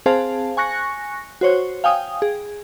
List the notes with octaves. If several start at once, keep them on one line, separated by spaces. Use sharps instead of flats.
C4 G#4 C5 F5 A5
G#5 C#6 F#6 A#6 C#7
F#4 C5 C#5
F5 G5 G#5 D#6
G#4